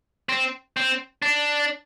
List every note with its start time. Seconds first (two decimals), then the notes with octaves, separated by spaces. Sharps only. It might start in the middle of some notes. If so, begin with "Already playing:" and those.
0.29 C4
0.77 C4
1.22 D4